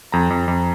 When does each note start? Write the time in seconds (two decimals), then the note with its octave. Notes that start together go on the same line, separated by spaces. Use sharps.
0.12 F2 A#5
0.30 F2
0.48 F2